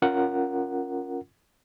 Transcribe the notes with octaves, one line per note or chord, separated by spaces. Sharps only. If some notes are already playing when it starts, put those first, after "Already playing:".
C#4 F4 A#4 F#5